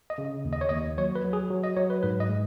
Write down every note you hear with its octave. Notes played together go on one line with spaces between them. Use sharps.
D#5
C#3
D#2
D#5
C#5
D#2 D#5
F#3 C#5
B4
F#3
G#4
F#3
D#5
F#3 C#5
B4
G#2 B4
D#5
G#3